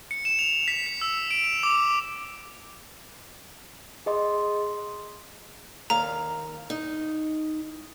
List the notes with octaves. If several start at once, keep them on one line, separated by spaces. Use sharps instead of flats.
C#7
E7
F7
B6
C#7
E6
D7
E7
D6
G#4 D#5 C6
D#2 F5 A#5
D#4